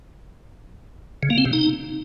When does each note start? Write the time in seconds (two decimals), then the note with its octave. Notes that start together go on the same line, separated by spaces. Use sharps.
1.23 C#3
1.30 A#3
1.38 C4
1.45 C3
1.53 D#4